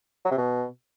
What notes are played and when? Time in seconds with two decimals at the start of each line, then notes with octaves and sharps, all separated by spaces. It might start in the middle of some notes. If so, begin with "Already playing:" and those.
0.25 F#3
0.31 C3
0.38 B2